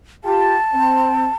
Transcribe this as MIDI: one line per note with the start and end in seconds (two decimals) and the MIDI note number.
0.24 0.56 65
0.24 0.56 67
0.24 1.35 81
0.73 1.27 60